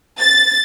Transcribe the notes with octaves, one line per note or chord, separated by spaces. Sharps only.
A6